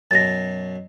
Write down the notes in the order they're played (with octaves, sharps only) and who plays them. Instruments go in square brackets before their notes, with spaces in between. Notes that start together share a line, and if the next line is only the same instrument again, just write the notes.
[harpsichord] F#2 B2 [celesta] A6 A#6